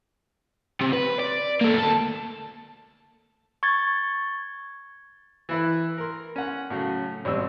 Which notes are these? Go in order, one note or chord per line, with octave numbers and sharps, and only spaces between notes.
C3
B4
D5
A#3 A4
D2 A5
C#6 G#6 A6
E3 E4 B4
A#4 C6
C#4 F#5
A2 C#3 F#3
G#1 B2 G3 C4 E6